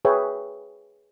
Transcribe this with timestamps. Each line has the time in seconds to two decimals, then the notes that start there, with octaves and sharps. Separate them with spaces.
0.05 G#4 B4 C#5 E5 G5